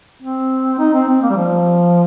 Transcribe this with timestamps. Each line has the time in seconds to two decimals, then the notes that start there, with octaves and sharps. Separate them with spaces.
0.22 C4
0.78 D#4
0.94 C4
1.08 C4
1.22 A#3
1.30 G3
1.37 F3